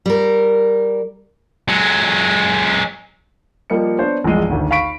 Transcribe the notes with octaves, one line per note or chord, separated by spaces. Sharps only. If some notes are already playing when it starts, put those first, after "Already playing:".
G3 A#4
F#3 G#3
F3 G3 A#3 D#5 C#7
B3 D4 C5 C#5
A#1 E2 G2 G#3 D#7
G#1 D2
F5 B5 C#6 B6 D7